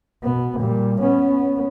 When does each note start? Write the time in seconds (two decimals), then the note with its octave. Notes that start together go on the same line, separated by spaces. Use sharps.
0.24 B2 B3
0.59 A#2 G3
1.01 B3 C#4